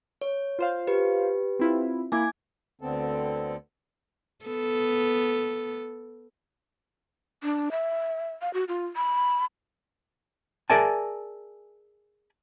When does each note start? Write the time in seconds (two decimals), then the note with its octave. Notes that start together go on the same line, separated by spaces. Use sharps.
0.21 C#5
0.59 F4 C5 F5
0.87 G4 B4
1.59 C4 E4 F4
2.12 A#3 E4 G#5 D6 G#6
2.81 D2 D3 B3 C4 A4
4.46 B3 A4
7.43 D4
7.71 E5
8.42 F5
8.54 F#4
8.68 F4
8.96 B5
10.70 G#4 A#4 D5 E5 G#5 A5